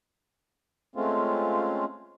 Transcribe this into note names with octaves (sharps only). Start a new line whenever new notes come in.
G#3 A3 C4 C#4 F4